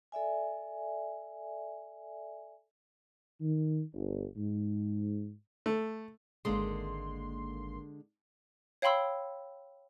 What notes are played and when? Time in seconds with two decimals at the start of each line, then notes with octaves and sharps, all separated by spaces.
0.12 A4 D5 E5 G#5
3.41 D#3
3.93 G1
4.37 G#2
5.66 A3
6.45 G#1 D3 G#3 A#3 C6
8.82 C#5 F5 G5 B5 C6 E6